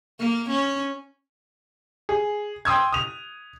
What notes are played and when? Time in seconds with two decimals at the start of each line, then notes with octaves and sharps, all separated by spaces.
0.19 A#3
0.50 C#4
2.09 G#4
2.65 G5 C6 D#6 E6 G#6
2.92 D#6 F7